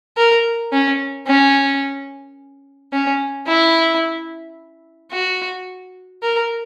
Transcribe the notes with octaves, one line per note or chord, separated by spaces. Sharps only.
A#4
C#4
C#4
C#4
E4
F#4
A#4